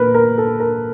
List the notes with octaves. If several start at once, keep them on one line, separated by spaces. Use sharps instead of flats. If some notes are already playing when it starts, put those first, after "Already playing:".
Already playing: A#2 A#4 B4
A#4
A4
A#4